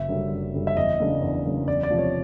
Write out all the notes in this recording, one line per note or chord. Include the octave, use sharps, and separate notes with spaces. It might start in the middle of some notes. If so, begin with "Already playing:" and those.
Already playing: F#1 E5
F#2 D3 G3
F#1
F#2 D3 G3
E5
E2 D#5
C#3 F#3 A#3 D4
E2
C#3 F#3 A#3 D4
E2 D5
D5
C3 F3
C#5